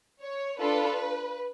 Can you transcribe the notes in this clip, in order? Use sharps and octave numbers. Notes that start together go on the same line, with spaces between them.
C#5
D4 F4 A4 B4